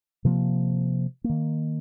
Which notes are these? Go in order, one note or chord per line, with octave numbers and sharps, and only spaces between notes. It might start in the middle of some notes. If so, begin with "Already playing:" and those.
C3 F3 A#3
A#3
D#3